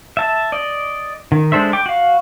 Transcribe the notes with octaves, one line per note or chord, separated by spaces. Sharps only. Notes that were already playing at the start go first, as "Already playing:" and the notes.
E5 A5
D5 D#5
D#3
G#3 D4 A4 C5 E5
G5 D6
F#4 F5